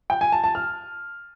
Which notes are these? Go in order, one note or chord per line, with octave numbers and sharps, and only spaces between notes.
G5
G#5
A5
A5
F6